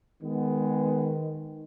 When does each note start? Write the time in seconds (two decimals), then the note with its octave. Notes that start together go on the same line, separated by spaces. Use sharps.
0.23 D#3 G#3 B3